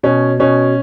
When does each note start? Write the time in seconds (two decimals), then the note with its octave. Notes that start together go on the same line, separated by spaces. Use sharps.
0.03 B2 C#4
0.40 B2 C#4